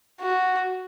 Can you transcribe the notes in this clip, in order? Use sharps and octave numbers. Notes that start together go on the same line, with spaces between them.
F#4